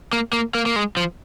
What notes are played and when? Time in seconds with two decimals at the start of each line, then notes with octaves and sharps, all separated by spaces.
0.13 A#3
0.33 A#3
0.55 A#3
0.66 A#3
0.76 G#3
0.97 F3